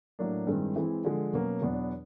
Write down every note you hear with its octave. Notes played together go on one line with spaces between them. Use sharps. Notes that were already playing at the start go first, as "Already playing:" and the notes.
A2 F#3 A#3 D4
G2 D#3 G#3 C4 E4
E3 G#3 C4 E4
D3 F3 G#3
B2 F#3 A#3 C#4
E2 B2 F#3 B3 D4